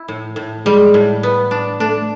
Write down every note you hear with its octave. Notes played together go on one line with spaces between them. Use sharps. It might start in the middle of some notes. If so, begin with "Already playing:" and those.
Already playing: E4
A2
A2
G3 G#3
A2
B3
D4
A3 D4